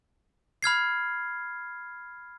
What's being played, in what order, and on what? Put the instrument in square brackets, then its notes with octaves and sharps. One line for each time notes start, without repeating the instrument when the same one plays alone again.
[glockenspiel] B5 F6 G#6 C7